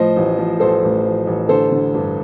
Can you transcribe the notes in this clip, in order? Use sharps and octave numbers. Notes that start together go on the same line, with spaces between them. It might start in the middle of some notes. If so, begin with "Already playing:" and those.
Already playing: A2 F3 C5 D#5
A1
F3
A1 A4 C5
A1
F3
A1
D3 A4 C5
D3
G2